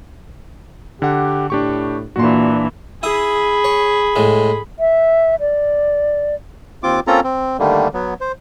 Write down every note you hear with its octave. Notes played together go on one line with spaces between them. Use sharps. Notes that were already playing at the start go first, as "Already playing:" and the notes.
D3 G4 F#5
A2 D4 G4 C#6
A#2 E3 D4 F#4 C6
E4 G#4 B5 D#6
C#5
A2 G#3
E5
D5
D#2 C4 F4 D6
A#3 C4 C#4 F4 A4 A#5
C4
D3 D#3 G3 A3 A#3
F#3 B3
C5